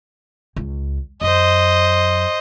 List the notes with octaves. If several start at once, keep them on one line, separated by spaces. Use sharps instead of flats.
C#2
F#2 C5 D#5